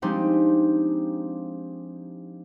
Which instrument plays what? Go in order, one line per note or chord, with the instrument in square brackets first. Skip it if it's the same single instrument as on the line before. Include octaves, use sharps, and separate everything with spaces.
[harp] F3 G#3 C4 D4 D#4 G4